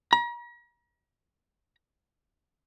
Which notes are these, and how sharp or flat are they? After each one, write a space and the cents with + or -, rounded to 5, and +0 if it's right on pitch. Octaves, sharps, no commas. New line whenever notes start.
A#5 +45